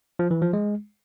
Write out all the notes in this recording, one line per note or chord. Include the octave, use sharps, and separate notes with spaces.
F3
E3
F3
G#3